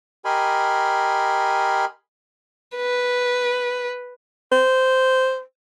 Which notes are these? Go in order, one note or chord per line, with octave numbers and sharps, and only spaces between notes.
G4 A#4 D#5 G#5 B5 C6
B4
C5